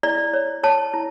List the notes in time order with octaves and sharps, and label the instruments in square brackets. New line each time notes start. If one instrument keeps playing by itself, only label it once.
[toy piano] E4 D5
C#5
C#5 A5
E4